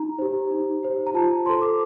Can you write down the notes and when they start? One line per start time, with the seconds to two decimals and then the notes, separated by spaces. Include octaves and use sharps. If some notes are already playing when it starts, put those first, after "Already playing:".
Already playing: D#4 A#5
0.19 G4 C5
0.51 D#4
0.83 G4 C5
1.07 A#5
1.14 F4 A5
1.46 A4 C5 C6
1.62 D6